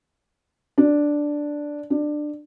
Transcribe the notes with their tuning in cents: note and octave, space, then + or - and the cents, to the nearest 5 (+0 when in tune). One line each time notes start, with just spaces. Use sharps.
D4 +0
D4 +20